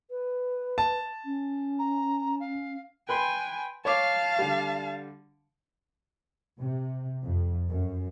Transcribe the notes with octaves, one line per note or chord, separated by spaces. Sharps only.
B4
A5
C#4
A#5
F5
B4 G5 G#5 B5 C6
C#5 F5 A5 D6
D3 G3
C3
F2
F#2